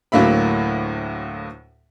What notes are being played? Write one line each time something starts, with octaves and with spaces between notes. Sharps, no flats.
D2 A2 F#3 A#3 E5 B5